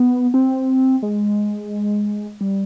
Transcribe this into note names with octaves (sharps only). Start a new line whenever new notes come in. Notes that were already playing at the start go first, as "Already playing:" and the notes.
Already playing: B3
C4
G#3
G3